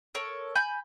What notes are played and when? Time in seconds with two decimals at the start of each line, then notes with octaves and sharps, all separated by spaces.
0.15 A4 A#4 C#5
0.55 G#5 B5 G6